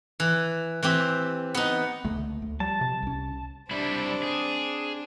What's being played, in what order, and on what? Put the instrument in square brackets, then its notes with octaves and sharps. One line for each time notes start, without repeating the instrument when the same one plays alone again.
[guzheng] E3
E3 C4 G4
B3 D#4
[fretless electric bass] C#2 D3 A#3 [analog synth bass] A3
[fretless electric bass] D2
[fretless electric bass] F3 [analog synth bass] G3 [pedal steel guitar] A5
[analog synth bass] C3
[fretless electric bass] C2 C#4
[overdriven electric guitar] G3 E4 [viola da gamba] C4 D4
[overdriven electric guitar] G#4